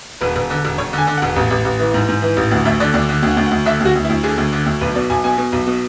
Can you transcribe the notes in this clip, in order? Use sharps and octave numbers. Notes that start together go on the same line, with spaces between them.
E1 B4
E1
D3
E1
E1 C#5
D3
G#5
D3
E1 F#5
A1
A1
A1
E3
G#2
G#2
E3
A1
D2 F#5
D2 E5
D3 D5
D2 D5
D3
D2
F#5
D2
F#5
D2
D3 E5
D2 F#4
D2
E4
D2
D3 G#4
D2
D3
D2
B1 B4
B2 D5
B1 G#5
B2 G#5
B2
B1
B2